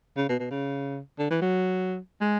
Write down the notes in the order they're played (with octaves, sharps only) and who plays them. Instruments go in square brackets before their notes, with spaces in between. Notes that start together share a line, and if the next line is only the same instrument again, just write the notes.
[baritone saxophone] C#3
B2
B2
C#3
D3
E3
F#3
G#3